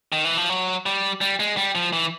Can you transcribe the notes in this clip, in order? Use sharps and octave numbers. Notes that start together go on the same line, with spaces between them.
D#3
E3
F3
F#3
G3
G3
G#3
G3
F3
E3